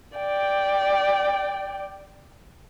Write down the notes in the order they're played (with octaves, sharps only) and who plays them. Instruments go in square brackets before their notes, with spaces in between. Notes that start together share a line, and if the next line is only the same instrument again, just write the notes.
[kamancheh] D5 G5